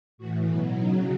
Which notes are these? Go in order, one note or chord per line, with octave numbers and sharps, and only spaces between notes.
A2 E3 F#4
B2 F#3 E4
C#3 F#3 D#4